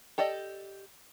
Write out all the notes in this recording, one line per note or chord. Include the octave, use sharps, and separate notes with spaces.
G4 A4 D5 D#5